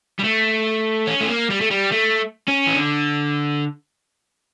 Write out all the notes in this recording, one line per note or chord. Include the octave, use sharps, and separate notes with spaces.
G3
A3
C#4
A3
A#3
G3
A3
G3
A3
C#4
E3
D3